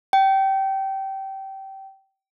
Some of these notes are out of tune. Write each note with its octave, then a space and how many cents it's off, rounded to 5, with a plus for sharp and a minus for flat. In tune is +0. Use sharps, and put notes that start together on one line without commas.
G5 -20